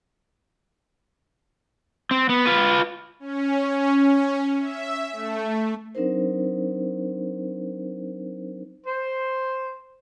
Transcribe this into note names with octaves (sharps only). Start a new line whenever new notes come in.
C4
B3
F4 B4
C#4
E5
A3
F#3 C4 D4 D#4 A#4 C5
C5